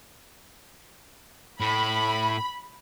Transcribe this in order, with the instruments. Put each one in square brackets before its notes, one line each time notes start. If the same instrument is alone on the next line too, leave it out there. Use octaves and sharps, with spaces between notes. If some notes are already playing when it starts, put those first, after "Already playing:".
[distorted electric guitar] A2 [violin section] B5